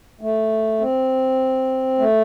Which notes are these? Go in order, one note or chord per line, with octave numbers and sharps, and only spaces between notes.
A3
C4
A3